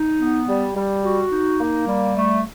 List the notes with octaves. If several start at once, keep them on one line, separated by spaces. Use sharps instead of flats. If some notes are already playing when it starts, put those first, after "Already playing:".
Already playing: D#4
B3
G3
G3
F#4
D#4
A#3
G3
A3